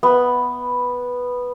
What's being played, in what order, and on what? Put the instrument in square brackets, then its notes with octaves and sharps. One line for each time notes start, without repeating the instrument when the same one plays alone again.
[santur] B3